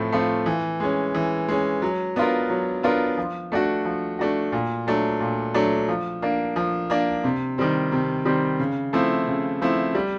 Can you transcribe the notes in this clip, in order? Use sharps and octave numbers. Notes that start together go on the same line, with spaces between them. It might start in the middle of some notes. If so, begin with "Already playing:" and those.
Already playing: A2 F3 A3 C4 F4
F3 A3 C4 F4
E3
G#3 C#4
E3
G#3 C#4
F#3
B3 D4 F4 A#4
F#3
B3 D4 F4 A#4
F3
A3 D4 F#4
F3
A3 D4 F#4
A#2
F#3 A3 D4
A#2
F#3 A3 D4
F3
A#3 D4
F3
A#3 D4
C3
D#3 G3 C4
C3
D#3 G3 C4
C#3
F3 A3 C4 E4
C#3
F3 A3 C4 E4
G3